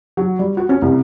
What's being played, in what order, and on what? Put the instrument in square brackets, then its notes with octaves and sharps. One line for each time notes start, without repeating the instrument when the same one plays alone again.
[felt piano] F#3
G3
F#4
C#4
C2